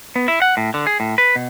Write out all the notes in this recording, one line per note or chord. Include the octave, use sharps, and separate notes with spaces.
B3
E4
F#5
A2
D3
G#4
A2
B4
B2